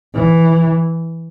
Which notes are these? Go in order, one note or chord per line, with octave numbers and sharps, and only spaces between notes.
E3